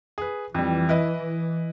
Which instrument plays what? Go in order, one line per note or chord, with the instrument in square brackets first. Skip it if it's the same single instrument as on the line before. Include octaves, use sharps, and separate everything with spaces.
[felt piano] G#4 B4
[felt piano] F2 G3 [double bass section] E3
[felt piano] E4 B4 D#5